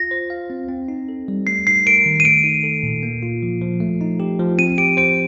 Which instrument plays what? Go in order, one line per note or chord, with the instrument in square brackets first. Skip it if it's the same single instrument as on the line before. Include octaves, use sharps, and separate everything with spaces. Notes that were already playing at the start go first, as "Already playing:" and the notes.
Already playing: [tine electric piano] F4 [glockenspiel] A#6
[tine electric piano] C5
F5
C4
C4
D#4
A4
G3
[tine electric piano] A3 [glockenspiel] C7
[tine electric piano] D#4 [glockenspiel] C7
[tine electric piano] A#4 [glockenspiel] D7
[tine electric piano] D#3
[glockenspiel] D#7
[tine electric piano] A3 [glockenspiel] D7
[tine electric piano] D#4
A4
A#2
A#3
F4
F3
F3
A3
D#4
G4
F3
[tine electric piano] C4 [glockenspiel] D#7
[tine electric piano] G4 [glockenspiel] D7
[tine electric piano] C5 [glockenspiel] D7